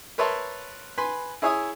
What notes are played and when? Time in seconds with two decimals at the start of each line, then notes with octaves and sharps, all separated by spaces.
0.18 A#4 B4 C#5 E5 A5 C6
0.98 B4 G#5 B5 C6
1.42 E4 G#4 C#5 E5 G#5 D#6